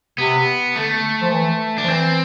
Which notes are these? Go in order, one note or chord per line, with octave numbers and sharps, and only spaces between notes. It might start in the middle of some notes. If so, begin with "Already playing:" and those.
C3 B3
D3 A3
F3
E3
D4
F3
E3 C4